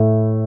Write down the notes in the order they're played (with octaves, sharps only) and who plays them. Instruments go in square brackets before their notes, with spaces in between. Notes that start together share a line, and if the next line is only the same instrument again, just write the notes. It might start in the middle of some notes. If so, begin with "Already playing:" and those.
Already playing: [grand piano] A2 A3 E4